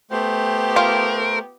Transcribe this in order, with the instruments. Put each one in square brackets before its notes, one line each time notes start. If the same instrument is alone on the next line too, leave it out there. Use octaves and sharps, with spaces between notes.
[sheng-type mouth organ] A3 C5 [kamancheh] B3 G4
[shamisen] F4 [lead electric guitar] A#4